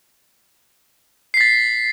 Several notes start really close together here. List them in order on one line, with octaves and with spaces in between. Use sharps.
C7 B6 A6